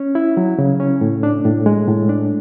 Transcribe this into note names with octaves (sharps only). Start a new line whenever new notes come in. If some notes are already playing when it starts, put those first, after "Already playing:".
Already playing: C#4
E4
F#3
C#3
C#4
A2
D4
A2
G#3
A2
D4